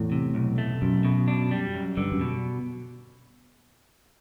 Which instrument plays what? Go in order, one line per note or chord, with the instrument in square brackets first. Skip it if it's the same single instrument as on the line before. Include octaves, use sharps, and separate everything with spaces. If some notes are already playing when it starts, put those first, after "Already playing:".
Already playing: [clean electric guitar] E2 [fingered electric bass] A2
[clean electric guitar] C3
B1
A3
[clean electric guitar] B1 [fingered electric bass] F#2
[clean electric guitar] B2
D4
G3
F#2
[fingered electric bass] G2 [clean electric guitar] D3
[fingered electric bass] F#2
[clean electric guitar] B2